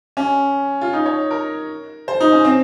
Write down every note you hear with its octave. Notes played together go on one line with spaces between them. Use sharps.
C#4
F4
D#4
C#5
A#4
C5
D#4
C#4
C4